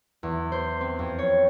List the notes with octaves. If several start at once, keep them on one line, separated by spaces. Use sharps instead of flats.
E2
C5
C4
F2
C#5